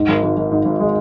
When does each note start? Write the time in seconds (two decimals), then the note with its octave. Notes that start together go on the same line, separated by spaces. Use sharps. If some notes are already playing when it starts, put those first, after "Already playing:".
Already playing: G#2
0.08 G#1
0.23 G#1
0.37 G#1
0.52 G#2
0.65 G#1
0.80 G#3